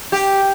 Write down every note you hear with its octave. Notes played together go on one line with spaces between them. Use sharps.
G4